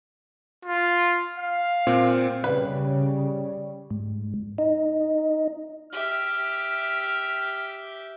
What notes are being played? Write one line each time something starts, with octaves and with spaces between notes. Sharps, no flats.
F4
F5
A#2 C4
C#3 G3 B4
G#2
D#4
G4 E5 F6